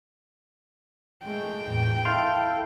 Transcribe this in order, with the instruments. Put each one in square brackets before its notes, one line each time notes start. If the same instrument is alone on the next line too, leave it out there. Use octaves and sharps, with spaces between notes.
[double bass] G#3 A3 [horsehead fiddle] G5
[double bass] E2 A2
[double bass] E4 [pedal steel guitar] A4 F5 C6